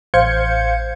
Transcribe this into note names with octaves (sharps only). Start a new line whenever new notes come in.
A1 C5 F5 G6 G#6 C#7